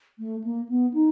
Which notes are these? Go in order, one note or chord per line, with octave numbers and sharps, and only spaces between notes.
A3
A#3
B3
D#4